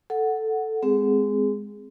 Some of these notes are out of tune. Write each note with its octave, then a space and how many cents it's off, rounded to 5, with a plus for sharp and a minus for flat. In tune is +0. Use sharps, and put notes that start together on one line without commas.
A4 +0 F#5 +0
G#3 +0 C4 -25 G#4 +0